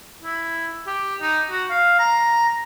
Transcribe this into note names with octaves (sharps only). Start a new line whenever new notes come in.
E4
G4
D#4
F#4
F5
A#5